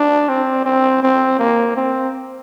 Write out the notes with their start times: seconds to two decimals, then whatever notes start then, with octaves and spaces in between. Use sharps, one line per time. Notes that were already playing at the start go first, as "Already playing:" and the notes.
Already playing: D4
0.29 C4
0.65 C4
1.03 C4
1.39 A#3
1.77 C4